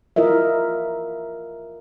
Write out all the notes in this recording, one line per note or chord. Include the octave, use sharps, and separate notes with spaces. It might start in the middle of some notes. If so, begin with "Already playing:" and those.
E4 F4 A#4 D#5 E5